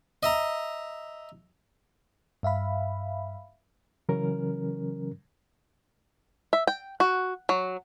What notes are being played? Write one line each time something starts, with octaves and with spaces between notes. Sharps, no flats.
D#5 E5 A#5
G2 E5 F5 B5
C#3 E3 F#3 C#4 A#4
E5
G5
F#4
F#3